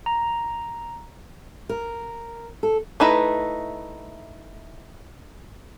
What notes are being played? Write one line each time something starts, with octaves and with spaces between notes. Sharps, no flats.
A#5
A#4
A4
A3 D#4 E4 B4